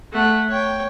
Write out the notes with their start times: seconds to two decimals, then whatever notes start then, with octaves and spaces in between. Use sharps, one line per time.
0.12 A3 F#5
0.49 C#5 G5